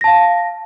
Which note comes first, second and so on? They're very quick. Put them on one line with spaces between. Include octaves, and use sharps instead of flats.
A#6 A5 F5